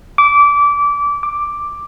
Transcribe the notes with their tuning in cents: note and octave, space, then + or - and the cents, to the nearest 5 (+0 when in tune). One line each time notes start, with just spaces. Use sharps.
D6 -20
D6 +5